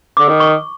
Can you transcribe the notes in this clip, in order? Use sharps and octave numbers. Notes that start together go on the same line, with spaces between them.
D3 D6
D#3
C#6